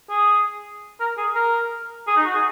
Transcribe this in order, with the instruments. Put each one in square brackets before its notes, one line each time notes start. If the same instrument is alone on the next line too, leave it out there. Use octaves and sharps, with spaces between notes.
[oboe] G#4
A#4
G#4
A#4
G#4
D#4
F#4
G#4